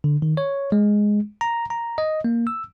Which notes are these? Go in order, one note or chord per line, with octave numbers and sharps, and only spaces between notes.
D3
D#3
C#5
G#3
A#5
A#5
D#5
A#3
E6